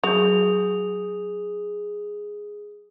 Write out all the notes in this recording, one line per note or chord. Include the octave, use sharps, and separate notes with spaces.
F#3 F#4 G#4 G6 F7